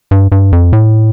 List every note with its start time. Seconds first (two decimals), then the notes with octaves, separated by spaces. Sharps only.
0.11 G2
0.32 G2
0.52 F2
0.73 A2